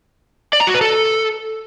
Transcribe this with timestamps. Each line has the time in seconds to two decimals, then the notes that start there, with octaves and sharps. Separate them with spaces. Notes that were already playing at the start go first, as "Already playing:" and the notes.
0.53 D5
0.60 A#5
0.67 F#4
0.74 B4
0.81 A4